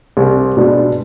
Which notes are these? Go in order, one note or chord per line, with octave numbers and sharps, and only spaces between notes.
C2
B2 G#3 D4